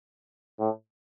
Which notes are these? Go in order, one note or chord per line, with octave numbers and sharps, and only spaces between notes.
A2